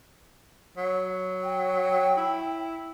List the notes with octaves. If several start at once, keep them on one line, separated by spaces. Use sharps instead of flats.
F#3
G5
E4